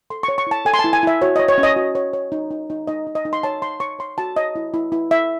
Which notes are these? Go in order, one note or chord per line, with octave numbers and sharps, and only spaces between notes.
A4 C6
C#6
C#5
C#6
E4 A5
A4 G#5
C6
A5
E4
G#5
E4 E5
F#4 C#5
C#5 D#5
C#5
C#4
D#5
F#4
C#5
C#5
D#4
D#4
D#4
D#4 D#5
D#4
D#5
D#4
C6
C#5 A5
C#5 C6
C#5 C#6
C#5 C6
F#4 A5
C#5 D#5
E4
E4
E4
E4 E5